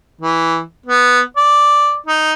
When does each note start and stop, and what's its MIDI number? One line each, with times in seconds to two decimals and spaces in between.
0.21 0.61 52
0.86 1.20 59
1.37 1.96 74
2.06 2.33 63